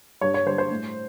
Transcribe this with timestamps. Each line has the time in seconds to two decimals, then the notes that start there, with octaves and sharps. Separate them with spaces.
0.21 G2 C#5
0.34 C#5
0.46 D3 G3 C5
0.58 C5
0.70 A2